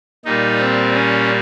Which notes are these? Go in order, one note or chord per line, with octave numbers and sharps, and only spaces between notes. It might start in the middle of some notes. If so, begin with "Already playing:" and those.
A#2 G3 A#3 D#4
C4
C#4